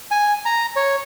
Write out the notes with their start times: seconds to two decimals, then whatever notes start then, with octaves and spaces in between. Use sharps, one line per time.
0.11 G#5
0.46 A#5
0.76 C#5